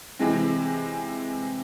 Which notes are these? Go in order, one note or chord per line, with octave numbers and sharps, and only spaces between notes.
C3 E3 G#3 C4